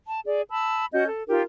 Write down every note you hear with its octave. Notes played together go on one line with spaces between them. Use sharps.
A5
G#4 D5
A5 B5 E6
C#4 F#4 D#5 G6
A4
D#4 F4 G4 A#4